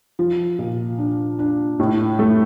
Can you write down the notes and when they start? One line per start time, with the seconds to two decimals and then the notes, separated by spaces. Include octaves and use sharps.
0.19 F3
0.59 A#2
0.98 D4
1.39 D4
1.79 A2
2.19 A3